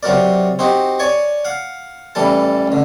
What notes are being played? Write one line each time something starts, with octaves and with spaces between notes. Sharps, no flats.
C3 F#3 F#4 A#4 D5
C4 D#4 F#4 G4
C#5 D5 G#5 C#6
F5 F#5
A1 E3 G3 A4 A5
A1 D3